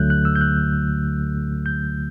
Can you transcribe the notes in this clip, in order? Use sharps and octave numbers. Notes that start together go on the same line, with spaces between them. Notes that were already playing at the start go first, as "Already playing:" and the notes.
Already playing: D2 D3 F#3 A3 F#6 G6
F#6
E6
G6
F#6
G6